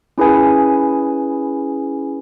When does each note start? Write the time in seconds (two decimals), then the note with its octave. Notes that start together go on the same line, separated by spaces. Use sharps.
0.18 C#4 E4 G#4 B4 G#5